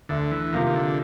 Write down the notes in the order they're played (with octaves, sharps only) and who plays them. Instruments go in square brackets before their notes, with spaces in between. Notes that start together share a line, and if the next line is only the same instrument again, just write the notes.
[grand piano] D2 [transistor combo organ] D3
[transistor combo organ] E3
[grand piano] C3 F3 A#3 [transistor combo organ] D#3
[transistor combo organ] D#3
D3